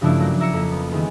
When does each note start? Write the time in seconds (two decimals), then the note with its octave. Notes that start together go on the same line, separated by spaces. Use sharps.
0.01 G2 C#3 F3 A3 D4 E4
0.20 F#3 A#3 A#4 A#6
0.40 E4 A#5 E6 C#7
0.53 F2 A#3
0.72 B3
0.91 D#3 E3 G#3 B3